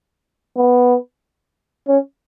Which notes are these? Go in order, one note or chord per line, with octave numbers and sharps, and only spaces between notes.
B3
C#4